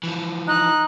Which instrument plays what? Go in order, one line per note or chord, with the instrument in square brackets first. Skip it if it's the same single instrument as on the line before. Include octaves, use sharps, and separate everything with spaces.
[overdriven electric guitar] E3 F3
[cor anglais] D#4 [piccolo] F#6